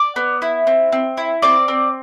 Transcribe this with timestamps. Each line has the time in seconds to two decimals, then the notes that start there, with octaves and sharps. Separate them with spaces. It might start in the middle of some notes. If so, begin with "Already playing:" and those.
Already playing: D5 D6
0.16 B3
0.42 E4
0.67 C4
0.92 C4
1.17 E4
1.42 C4 D5 D6
1.68 C4